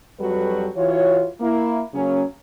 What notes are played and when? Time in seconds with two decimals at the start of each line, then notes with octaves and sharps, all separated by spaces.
0.20 F2 F#3 G3 F#4 A4 B4
0.76 E3 F4 F#4 C#5
1.41 A#3 E4
1.94 C#3 F#3 A#3 C#4